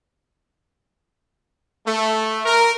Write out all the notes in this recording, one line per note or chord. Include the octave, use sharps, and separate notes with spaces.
A3
A#4